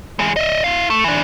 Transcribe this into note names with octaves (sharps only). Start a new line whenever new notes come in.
E3 G#3
D#5 E5
E4 F5
A3
E3 D4